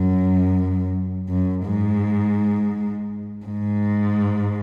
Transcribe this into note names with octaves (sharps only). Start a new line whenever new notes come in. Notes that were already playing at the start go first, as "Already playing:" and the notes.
Already playing: F#2
F#2
G#2
G#2